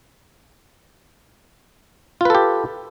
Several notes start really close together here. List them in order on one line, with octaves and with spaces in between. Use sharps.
F4 B4 A4 G4